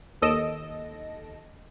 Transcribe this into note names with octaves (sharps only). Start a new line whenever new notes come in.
D#2 A4 D#5 A#6 D7 E7